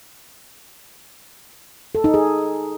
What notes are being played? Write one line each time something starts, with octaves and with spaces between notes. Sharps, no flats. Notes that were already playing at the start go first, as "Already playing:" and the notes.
A4
D#4
G#4